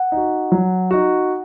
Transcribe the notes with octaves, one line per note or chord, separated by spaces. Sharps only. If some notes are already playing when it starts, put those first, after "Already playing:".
Already playing: F#5
D#4
F#4
F#3
D#4 F#4